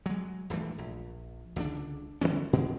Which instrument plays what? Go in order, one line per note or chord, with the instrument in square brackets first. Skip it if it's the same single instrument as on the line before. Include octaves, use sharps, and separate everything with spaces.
[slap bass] F#3 G#3
D#1 G2 E3 A3
A#1
C#2 D3 A#3 D4
D3 F#3 G3 C#4
A#2 G#3 C4